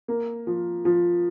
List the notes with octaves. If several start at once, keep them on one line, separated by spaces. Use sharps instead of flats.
A#3
F3
F3